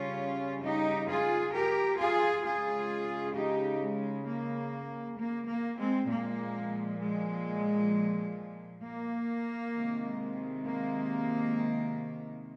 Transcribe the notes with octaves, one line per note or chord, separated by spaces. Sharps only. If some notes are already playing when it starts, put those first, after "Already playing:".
Already playing: C#3 G3 C#4 F4
D#4 G4
F4 G#4
G4 A#4
F4 G#4
C#3 G#3 F4 G#4
D#4 G4
G#3
A#3
A#3
A#3
G#3 C4
A#2 F3 G#3 A#3
G#3
A#3
C3 D#3 G#3
A#3